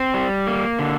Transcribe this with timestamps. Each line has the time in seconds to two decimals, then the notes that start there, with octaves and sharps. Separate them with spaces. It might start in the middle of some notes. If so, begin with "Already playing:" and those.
Already playing: C4
0.14 G3
0.47 A#3
0.79 D3